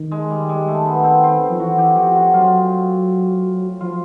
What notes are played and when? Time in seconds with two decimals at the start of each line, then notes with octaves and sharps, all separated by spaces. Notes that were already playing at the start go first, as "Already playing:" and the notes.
Already playing: D#3
0.12 G#3
0.30 G3
0.49 G#3
0.68 A3
0.86 B3
1.04 C4
1.23 C4
1.50 F3
1.60 E3 F#4
1.78 G4
1.96 F3 F#4
2.16 F#4
2.34 F#3 F4
3.81 F3 F4